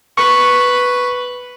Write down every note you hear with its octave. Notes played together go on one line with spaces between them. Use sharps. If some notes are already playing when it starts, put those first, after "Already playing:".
B4 C#6